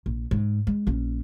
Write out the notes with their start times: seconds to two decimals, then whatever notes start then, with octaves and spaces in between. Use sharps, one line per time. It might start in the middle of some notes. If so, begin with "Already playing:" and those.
0.06 A#1
0.31 G#2
0.67 G#3
0.87 A#1 C#4